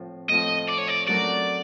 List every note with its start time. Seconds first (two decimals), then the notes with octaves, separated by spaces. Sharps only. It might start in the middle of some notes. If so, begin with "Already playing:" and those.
Already playing: A2 F3 A3 C4 F4
0.29 A2 F3 A3 C4 F4 D#5
0.69 D5
0.78 C#5
0.88 D5
1.08 F#3 A3 C#4 F#4 A#4 D5